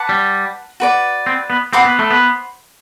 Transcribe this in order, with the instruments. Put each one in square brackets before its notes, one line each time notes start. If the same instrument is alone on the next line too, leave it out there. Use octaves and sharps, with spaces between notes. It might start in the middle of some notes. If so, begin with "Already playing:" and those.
Already playing: [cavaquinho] B4 F#5 A5 D6
[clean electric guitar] G3
[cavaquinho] F#4 B4 D5
[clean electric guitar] C4
B3
[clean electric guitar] C4 [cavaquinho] C5 F#5 B5 D6
[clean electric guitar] B3
A3
B3